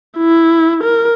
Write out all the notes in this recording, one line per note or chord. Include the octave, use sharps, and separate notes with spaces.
E4
A#4